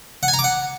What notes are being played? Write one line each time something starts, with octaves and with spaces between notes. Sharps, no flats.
F#5
G#5
A#5
D6
F#5